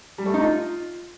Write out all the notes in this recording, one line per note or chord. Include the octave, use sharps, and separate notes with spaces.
G3
A3
D#4
F4